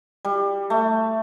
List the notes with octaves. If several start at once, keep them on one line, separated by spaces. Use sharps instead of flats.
G3
A3